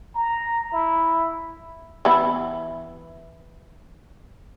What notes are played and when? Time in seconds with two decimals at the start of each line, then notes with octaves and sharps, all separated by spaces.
0.15 A#5
0.72 E4
2.05 E3 B3 E4